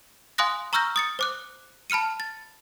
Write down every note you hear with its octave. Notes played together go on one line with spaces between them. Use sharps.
F5 G#5 C6 D#6 F#6 A#6
A#5 C#6 E6 F6 G6 A#6
D#6 A6 C#7
C5 D6 F#6
A5 B5 F6 C#7 D#7
A6